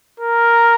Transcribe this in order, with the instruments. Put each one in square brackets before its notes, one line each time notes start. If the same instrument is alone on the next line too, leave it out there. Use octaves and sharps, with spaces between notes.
[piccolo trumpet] A#4